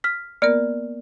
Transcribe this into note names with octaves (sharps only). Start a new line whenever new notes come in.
F6 B6
A#3 B3 A#4 D5 F6